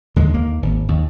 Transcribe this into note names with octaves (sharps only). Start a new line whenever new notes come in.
D#2 D3 G#3
D#2 A#3
G#1
D#2